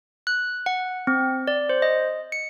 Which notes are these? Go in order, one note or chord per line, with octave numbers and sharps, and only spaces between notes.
F#6
F#5
C4
D5
C5
D#5
C#7